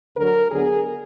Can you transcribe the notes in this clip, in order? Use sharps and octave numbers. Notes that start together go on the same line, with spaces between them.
D2 D3 F#3 A#4
D2 D3 F#3 B3 G#4